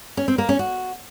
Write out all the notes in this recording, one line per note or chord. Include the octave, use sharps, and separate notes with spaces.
C#4
C4
A#3
C#4
F#4